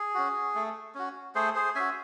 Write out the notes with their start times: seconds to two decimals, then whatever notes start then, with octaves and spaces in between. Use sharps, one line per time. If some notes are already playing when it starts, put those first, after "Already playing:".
Already playing: G#4
0.14 C#4 F#4
0.55 A3
0.95 C#4 F#4
1.35 A3 G#4 C5
1.55 G#4 C5
1.75 C#4 F#4 E5 G#5